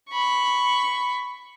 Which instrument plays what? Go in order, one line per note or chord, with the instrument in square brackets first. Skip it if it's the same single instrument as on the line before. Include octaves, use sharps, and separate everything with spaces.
[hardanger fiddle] B5 C#6